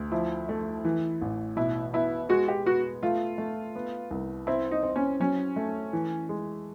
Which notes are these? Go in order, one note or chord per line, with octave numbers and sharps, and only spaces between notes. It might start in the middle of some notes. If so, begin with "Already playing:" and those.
Already playing: D2
F3 E4
A3
E3
A1
B2 E4
B3 E4
G#3 F#4
G4
B3 F#4
A3 F4
A3
B3
C2
C4 E4
D#4
C4
C#4
F#3 C#4
A3
E3
G#3